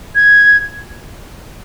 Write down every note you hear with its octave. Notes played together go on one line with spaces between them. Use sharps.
G#6